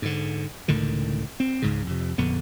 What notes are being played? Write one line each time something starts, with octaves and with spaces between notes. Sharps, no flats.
G#2 D3
C#2 A2 D3 D#3
C4
C#2 G#2 C#3
F2 C3
A#1 F2 D3 B3